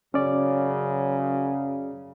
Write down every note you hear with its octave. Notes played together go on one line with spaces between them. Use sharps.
F#2 C#3 F#3 C#4 D5